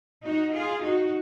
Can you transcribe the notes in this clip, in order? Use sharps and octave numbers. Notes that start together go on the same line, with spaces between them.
D#4 F#4
F4 G#4
D#4 F#4